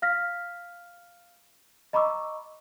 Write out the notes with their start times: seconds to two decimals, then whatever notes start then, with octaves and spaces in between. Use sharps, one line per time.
0.02 F5 F6 A#6 B6
1.93 D#5 A#5 B5 C#6 D6 E6